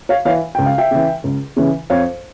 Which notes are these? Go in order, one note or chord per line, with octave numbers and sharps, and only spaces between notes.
C#5 F5
E3 C#5 F5
C#2 G5
F5
E5 G5
C#3 E3
C#2
C#3 E3
F2 C#5 F5